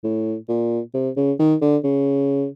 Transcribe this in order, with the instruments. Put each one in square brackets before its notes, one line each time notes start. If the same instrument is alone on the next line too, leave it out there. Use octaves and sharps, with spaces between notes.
[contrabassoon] A2
A#2
C3
C#3
D#3
D3
C#3